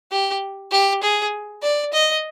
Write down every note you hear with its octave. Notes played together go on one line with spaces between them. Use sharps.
G4
G4
G#4
D5
D#5